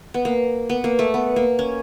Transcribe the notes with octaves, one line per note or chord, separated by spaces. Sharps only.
B3
A#3
B3
A#3
A3
B3
A#3
C#4